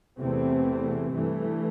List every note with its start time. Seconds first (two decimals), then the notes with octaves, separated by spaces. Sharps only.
0.19 E2 C3 E3 A3 C4
1.10 G2 E3 A3